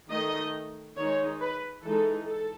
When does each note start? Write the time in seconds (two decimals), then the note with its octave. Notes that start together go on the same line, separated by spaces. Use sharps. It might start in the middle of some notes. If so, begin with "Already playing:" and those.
0.10 D#3 A3 D#4 D#5
0.96 D#3 G#3 D#4 C#5
1.40 B4
1.83 E3 G#3 D#4 A4
2.26 A4